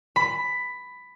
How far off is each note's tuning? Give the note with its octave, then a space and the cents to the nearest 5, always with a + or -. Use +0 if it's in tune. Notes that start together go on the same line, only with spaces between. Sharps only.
B5 +10